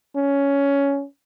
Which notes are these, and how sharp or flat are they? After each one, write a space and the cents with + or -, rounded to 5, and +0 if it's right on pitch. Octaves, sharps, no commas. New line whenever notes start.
C#4 +10